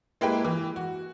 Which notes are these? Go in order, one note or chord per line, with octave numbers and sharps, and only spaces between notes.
G#3 A#3 E4 G4 B4 G5
E3
F#4